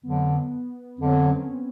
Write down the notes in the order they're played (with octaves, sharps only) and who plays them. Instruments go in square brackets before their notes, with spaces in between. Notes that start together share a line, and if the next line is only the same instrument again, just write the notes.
[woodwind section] F2 D3 F#3 [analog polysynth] B3
[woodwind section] F2 D3 F#3 [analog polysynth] C4
[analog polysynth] C#4